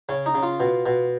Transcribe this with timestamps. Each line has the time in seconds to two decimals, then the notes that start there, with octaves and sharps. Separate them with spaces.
0.09 C#3 C#4
0.26 D#4
0.35 C#3
0.43 F4
0.60 B2
0.86 B2